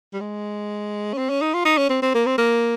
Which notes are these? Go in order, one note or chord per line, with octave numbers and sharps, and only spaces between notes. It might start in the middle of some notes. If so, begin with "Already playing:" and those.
G3
G#3
C#4
C4
C#4
D#4
F4
D#4
C#4
C4
C4
A#3
C4
A#3